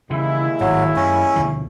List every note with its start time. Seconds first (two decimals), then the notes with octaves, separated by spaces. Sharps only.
0.10 D#2 C#3 E3 G#3 E4
0.61 G#1 A2 F#3
0.96 F#2 C#4
1.36 D2 B2 F3